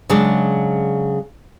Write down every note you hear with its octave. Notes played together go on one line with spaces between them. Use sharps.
C#3 F#3 G#3 D4